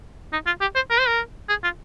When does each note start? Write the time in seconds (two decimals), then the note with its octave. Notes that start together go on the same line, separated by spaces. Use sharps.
0.33 D#4
0.46 F4
0.61 G4
0.75 C5
0.90 A#4
1.00 C5
1.08 A#4
1.49 G#4
1.64 F4